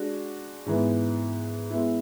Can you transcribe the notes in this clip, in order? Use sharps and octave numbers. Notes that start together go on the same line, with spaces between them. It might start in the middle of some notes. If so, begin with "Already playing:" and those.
Already playing: G#3 D4 F#4
G#2 E3 B3
G#3 B3 E4